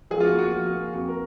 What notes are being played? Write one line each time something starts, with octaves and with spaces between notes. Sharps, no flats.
F3 G#4
F4
F#4
A#3
F#4
F3 F#4
F#4
A#3
F2 F#4
A#4